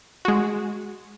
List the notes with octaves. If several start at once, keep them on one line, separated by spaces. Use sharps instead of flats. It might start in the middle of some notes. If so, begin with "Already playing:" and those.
G#3 F#4